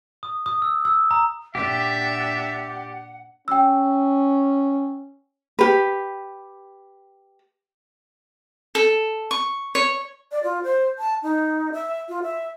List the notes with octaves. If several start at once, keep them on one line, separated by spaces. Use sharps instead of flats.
D#6
D#6
E6
E6
A#5
A#2 D4 G4 E5 F#5
C#4 G5 E6
G4 B4
A4
C#6
C#5
D5
F4
C5
A5
D#4
E5
F4
E5